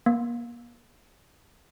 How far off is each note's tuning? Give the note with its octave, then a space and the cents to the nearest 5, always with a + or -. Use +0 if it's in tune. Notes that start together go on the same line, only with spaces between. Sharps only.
A#3 +35